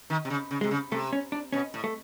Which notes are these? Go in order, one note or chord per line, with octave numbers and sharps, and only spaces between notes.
D#3
C3
C#3
C#3
C3 G#3
C#3
C3 A3
C#4
D4
B2 C#4
A2
A3